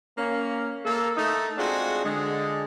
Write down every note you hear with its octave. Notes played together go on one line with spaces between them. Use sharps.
A#3 C#4
A#3 A4
A3 D#4
G#3 C4 D4 F4 F#4
D3 G#3